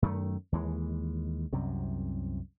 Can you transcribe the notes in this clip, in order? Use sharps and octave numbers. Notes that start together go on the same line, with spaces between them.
F#2 D#3 A3
D#2 E3 G#3
C2 F#2 C3